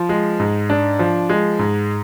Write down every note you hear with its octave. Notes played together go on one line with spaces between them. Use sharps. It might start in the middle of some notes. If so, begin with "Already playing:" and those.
Already playing: F3
G#3
G#2
D4
F3
G#3
G#2